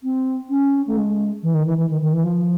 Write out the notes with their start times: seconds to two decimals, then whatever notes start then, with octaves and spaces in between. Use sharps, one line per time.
0.03 C4
0.50 C#4
0.87 A3
0.97 G#3
1.43 E3
1.54 D#3
1.66 E3
1.78 E3
1.90 D#3
2.01 D#3
2.13 E3
2.24 F3